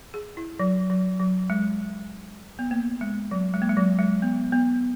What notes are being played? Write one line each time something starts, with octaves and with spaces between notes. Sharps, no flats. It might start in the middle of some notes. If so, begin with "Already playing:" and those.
G#4
E4
F#3
F#3
F#3
G#3
B3
A#3
G#3
F#3
G#3
A#3
G#3
F#3
G#3
B3
B3